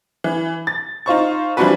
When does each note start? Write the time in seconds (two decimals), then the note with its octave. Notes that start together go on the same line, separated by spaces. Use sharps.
0.24 E3
0.67 A6
1.06 D#4 F4 C5 C#6
1.57 E3 F3 G3 D4 F#4 B4